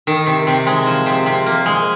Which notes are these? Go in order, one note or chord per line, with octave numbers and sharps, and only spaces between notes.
D#3
C3
C3
G#3
F3
C3
C3
A#3
G#3